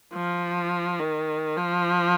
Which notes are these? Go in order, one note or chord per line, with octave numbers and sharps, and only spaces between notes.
F3
D#3
F3